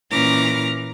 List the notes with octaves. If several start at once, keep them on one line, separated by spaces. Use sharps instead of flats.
A#2 E3 C#4 A#5 D6 F6